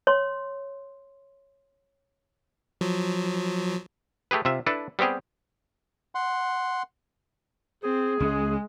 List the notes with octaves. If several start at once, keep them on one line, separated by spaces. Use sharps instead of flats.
C#5 C6
F3 F#3
A3 G4 G#4 B4
C3 F4 E5
D4 E4 A4 B4
G3 B3 C4 G4 G#4
F#5 C6
C4 G#4
C#2 G#3 C#4